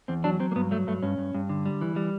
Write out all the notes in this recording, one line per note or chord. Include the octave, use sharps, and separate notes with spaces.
E2 C4
F#3 D4
F#3 C4
A#3
G2 B3
F#3 A3
G2 A3
G2 C#4
G2
G2
D3
G3
E3
G3